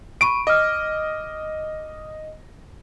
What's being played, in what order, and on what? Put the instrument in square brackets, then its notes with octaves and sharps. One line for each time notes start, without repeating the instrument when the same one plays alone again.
[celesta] B5 C#6 D#7 [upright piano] D7
[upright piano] D#5 [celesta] D6 F6